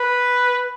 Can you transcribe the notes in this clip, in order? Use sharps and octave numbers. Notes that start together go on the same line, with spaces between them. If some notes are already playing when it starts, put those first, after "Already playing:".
Already playing: B4